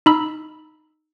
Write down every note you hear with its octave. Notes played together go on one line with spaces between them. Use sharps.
D#4 B5 E6